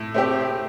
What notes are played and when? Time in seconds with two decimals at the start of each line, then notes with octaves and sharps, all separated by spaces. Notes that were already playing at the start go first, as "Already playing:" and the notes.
Already playing: A2
0.14 A3 C4 G4